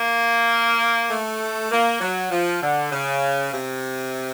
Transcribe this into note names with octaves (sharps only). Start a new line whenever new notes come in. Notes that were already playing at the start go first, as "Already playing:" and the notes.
Already playing: A#3
A3
A#3
F#3
F3
D3
C#3
C3